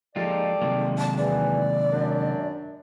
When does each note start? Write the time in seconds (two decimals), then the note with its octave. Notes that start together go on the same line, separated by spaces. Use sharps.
0.16 F3 G#3 A#3 D#4 F4 G4 A4 D5
0.62 C3 D#3 F#3 G#3 A#3
0.98 A5
1.18 E2 E3 D5
1.92 F#2 D4